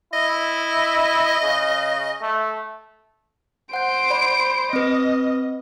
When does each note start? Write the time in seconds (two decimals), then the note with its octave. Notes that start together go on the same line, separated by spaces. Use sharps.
0.13 E4 D#5
1.42 C#3
2.21 A3
3.73 C5 F#5 G6 D7
4.10 D5 B5
4.73 C4 B4 D#5